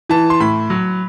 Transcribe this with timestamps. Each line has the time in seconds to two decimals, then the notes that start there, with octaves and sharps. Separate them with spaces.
0.09 E3 A5
0.30 C6
0.40 A2 B5
0.70 F#3